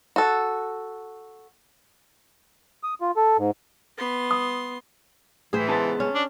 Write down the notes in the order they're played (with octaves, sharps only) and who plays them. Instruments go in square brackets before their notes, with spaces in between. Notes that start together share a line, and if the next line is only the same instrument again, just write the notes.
[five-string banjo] F#4 A4
[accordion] D#6
F4
A4
G#2
[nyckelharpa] B3 C6
[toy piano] D#6
[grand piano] A2 B6 [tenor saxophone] E3 [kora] G#4 C5
[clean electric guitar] C#3 G#3 B3 [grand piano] A5 C6 A6
[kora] C#4
[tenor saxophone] D4